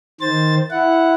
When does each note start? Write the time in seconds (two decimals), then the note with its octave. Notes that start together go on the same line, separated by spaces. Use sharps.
0.21 D#3 C5 A6
0.71 E4 F#5